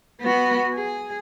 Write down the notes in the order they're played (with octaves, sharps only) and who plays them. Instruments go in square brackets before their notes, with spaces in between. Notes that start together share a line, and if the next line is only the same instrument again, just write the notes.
[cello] B3 F#4
G#4